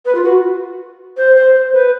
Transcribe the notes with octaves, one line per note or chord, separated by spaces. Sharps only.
B4
F4
F#4
C5
C5
C5
B4